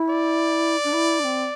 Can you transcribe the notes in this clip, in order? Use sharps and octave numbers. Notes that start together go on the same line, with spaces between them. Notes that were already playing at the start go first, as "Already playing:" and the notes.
Already playing: E4
D5
D4
E4
D4
C4